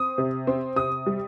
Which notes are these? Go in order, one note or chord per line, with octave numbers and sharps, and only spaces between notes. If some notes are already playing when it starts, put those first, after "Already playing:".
Already playing: C4 D#6
C3
C4
C3 D#6
G3